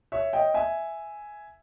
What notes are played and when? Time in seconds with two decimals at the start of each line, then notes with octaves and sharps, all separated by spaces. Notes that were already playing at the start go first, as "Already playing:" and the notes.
0.12 C#5 E5
0.33 D#5 G5
0.54 E5 G#5